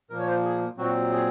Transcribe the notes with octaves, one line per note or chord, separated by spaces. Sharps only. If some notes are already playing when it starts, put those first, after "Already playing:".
A#2 F3 A#3 A#4
C#5
C5
G#4
A#2 F#3 C4 F#4
G#4